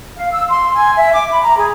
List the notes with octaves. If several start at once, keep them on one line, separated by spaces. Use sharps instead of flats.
F5
E6
C6
G#5
E5
D6
B5
A#5
G#4